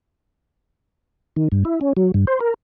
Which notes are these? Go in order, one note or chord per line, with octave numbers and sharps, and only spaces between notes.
D#3
G2
E4
C#4
F#3
G2
C5
A#4